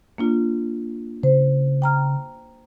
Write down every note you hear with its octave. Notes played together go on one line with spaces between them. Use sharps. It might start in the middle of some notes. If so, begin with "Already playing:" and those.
A#3 D4 F4
C#3 C5
G5 A#5 F6